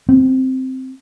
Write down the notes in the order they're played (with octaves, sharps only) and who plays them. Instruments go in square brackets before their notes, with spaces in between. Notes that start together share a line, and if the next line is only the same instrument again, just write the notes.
[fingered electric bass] C4